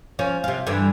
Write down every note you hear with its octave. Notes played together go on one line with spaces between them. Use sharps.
F3 C#4
C3 F4
G2 D3 E3